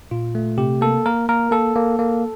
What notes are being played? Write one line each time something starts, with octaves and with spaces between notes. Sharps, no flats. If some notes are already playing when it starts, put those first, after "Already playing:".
A#2 F4
A3
C3 G4
A#3 A4
A#3 A#4
A#3 A#4
A#3 A4
A#3
A#3